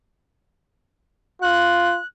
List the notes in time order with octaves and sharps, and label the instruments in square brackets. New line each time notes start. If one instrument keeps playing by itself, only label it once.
[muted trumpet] F4 [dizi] F#6